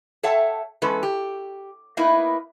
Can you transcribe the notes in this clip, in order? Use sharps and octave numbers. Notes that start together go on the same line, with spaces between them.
A4 C#5 E5 F#5 G5 A5
E2 G#3 C#4 A4 B4
G4
A#3 B3 D#4 E4 B4